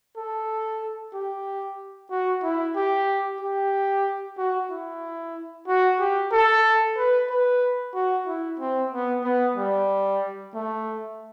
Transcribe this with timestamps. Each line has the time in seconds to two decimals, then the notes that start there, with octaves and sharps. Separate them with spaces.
0.17 A4
1.14 G4
2.11 F#4
2.43 E4
2.76 G4
3.41 G4
4.37 F#4
4.71 E4
5.68 F#4
6.00 G4
6.32 A4
6.97 B4
7.30 B4
7.95 F#4
8.27 E4
8.60 C4
8.92 B3
9.24 B3
9.56 G3
10.54 A3